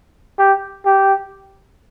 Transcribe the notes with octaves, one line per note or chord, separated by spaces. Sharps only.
G4
G4